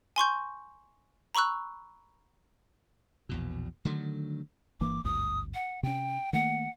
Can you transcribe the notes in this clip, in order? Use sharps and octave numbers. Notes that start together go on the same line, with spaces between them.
G#5 C6 C#6 G6
A#5 B5 C#6 E6 F#6
A#1 E2 B2
D3 D#3 F#3 A3
G1 E3 A#3 D6
G#1 D2 G2 D#6
F#5
C3 C#4 G5
D#3 A3 A#3 F#5